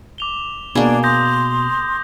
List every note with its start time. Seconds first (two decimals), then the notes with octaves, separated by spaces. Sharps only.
0.18 D6 F7 G7
0.75 B2 A#3 D4 G#4
1.04 C6 D#6 G6 A#6